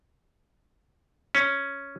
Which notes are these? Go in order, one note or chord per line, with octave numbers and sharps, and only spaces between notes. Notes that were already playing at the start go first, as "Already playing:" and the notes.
C#4